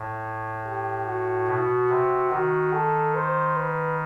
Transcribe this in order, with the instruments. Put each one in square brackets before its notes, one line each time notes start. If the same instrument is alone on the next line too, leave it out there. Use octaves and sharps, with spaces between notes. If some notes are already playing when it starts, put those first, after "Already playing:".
Already playing: [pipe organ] A2
[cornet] G4
F#4
[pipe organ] B2
C3
[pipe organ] D#3 [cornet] F#4
[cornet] A4
C5
B4